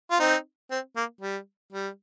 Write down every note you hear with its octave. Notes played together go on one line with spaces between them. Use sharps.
F4
C4 D#4
C4
A#3
G3
G3